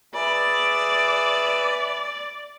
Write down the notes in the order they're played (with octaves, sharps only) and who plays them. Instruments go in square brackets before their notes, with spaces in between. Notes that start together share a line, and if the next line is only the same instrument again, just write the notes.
[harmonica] G#4 B4 E5 [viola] D5